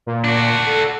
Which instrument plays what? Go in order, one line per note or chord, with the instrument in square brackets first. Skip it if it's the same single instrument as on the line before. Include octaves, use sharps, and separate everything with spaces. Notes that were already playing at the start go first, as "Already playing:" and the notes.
[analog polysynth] A#2
[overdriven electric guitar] D4 F#4
[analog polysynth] A4